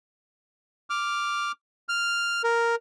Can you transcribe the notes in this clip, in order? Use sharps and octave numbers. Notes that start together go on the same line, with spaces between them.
D6 F6
F6
A#4